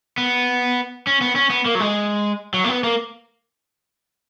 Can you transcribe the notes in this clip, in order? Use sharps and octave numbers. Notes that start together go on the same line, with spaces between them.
B3
C#4
B3
C#4
B3
A#3
F#3
G#3
F#3
A#3
B3
A#3